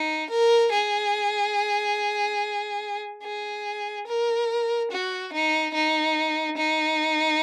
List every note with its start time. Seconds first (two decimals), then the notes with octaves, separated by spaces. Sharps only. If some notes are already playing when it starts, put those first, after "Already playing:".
Already playing: D#4
0.30 A#4
0.72 G#4
3.23 G#4
4.07 A#4
4.91 F#4
5.33 D#4
5.74 D#4
6.57 D#4